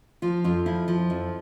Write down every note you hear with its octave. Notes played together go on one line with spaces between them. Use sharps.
F3 F4
F2 F4
F3 E4
F3
F2